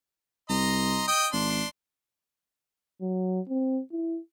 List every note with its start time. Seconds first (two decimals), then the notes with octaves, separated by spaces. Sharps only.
0.49 C2 D#5 A#5 C6
1.08 D#5 G5 D#6
1.33 G#1 D4 C6
3.01 F#3
3.49 C4
3.92 E4